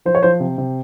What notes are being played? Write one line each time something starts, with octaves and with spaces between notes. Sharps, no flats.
F3 C5
C#5
F3 C5
C3
C3